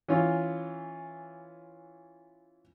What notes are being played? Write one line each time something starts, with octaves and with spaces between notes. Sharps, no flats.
E3 C#4 F4